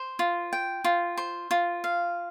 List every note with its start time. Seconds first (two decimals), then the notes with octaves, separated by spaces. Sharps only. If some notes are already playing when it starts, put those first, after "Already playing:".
Already playing: C5
0.19 F4
0.53 G5
0.84 F4
1.17 C5
1.51 F4
1.84 F5